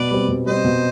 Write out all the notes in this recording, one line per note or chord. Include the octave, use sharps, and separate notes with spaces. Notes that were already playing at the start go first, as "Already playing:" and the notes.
Already playing: B2 B4 D5
G3 C4
B2
G3 C4 C5 D#5
B2